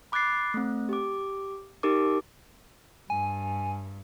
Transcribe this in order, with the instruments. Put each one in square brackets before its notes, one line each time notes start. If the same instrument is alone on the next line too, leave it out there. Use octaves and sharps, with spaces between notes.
[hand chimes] B5 D6 F#6 G#6 A6 C7
A3 C4
G4 D6
D#4 G4 A#4 D6
[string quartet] G2 [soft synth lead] G#5